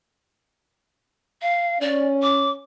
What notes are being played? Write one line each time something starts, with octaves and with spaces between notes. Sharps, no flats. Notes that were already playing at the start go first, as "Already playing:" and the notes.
F5
C#4 D5
D6